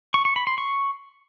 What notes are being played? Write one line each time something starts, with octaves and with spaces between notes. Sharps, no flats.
C#6
C#6
B5
C6
C#6